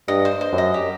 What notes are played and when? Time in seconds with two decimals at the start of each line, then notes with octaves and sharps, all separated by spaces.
0.08 G2 D#5
0.25 C5
0.41 C5
0.52 F#2
0.58 D#5
0.74 G4